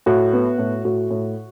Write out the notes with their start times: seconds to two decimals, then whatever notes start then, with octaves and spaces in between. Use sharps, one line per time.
0.06 A2 F#4
0.33 B3
0.58 A2
0.85 A2 F#4
1.10 A2